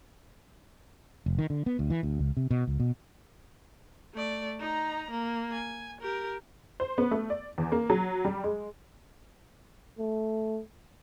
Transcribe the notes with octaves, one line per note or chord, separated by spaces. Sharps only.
F1
D#3
D3
B3
D2
E3
D2
C#2
C3
B2
C#2
B2
A3 D5
D#4 A#5
A#3
G#5
G4 A#4
C5
B3
A3
D5
E2
A#3
F#3
G3
G#3
A3